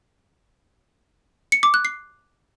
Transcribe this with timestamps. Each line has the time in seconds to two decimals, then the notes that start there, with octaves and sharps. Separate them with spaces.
1.52 C#7
1.63 D6
1.74 F#6
1.85 C7